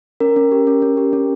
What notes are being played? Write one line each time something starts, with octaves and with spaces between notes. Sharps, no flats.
C#4 A#4
C#4
G4
C#4
C#4
G4
C#4